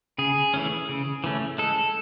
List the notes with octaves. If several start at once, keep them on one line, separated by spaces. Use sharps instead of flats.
C#3 G#4
E3 A3 C#4
C#3
E3 A3 C#4
G#3 A4